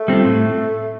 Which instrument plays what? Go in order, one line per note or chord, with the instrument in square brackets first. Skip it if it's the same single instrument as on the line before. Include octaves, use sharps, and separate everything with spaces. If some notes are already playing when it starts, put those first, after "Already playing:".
Already playing: [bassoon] A3
[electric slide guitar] G3 C4 F4
A2